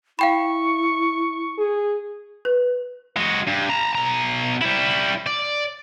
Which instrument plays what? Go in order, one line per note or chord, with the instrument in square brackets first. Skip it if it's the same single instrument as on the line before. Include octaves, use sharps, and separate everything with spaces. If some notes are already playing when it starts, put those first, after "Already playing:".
[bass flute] E4 [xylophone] F5 G5 B5 [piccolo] C#6
[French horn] G#4
[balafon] B4
[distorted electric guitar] G#3 F#4
G2
A5 A#5
B2 A#5
G3 E4
D5